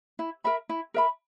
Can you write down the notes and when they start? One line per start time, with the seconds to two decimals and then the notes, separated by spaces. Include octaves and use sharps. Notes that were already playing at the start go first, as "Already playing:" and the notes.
0.19 E4
0.44 A#4 E5 B5
0.69 E4
0.94 A#4 E5 B5